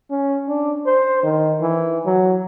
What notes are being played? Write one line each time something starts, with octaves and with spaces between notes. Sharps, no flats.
C#4
D4
C5
D#3
E3
F#3